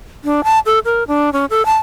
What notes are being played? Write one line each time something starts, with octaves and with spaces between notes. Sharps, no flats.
D4
A5
A4
A#4
D4
C#4
A4
A5